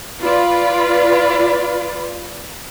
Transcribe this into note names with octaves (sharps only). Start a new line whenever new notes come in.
F4 B4 D5